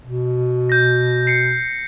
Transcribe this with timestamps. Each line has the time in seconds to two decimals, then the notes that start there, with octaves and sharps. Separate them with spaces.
0.05 B2
0.70 G6 A#6
1.27 C7 C#7